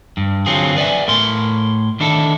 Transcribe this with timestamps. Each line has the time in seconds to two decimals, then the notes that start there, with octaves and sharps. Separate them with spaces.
0.17 G2
0.46 D3 F#3 C4 F4 G#4
0.76 B4 D5 E5 G#5
1.08 A2 A#4 C6
2.00 D#3 D4 E4 A4